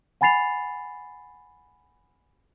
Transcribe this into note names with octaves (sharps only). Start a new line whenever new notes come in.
F#5 G#5 B5 A6 C7 F7